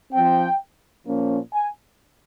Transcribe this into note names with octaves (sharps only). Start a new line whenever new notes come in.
F3 C4 G5
A#2 F3 A#3 C#4
G#5